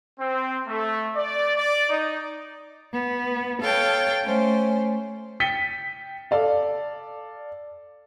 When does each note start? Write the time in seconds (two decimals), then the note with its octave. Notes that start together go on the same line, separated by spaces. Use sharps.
0.19 C4
0.67 A3
1.16 D5
1.56 D5
1.90 D#4
2.92 B3
3.62 A4 C#5 F5 G5 A5
4.23 A3 C#4 C5
5.40 G5 A6 B6 C#7 D#7 G7
6.31 A4 D5 F5